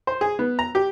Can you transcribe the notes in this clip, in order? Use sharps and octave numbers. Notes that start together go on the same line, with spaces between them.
C5
G#4
B3
A#5
G4